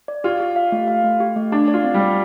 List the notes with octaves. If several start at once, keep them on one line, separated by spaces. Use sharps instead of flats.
D5
F4 G4
G4
F5
A3
F5
A3
G4
A3
D4 G4
D5
F4
C4
G3
D5